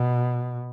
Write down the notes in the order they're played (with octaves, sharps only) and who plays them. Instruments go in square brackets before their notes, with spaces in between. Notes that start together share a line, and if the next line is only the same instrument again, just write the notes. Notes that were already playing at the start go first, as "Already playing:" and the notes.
Already playing: [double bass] B2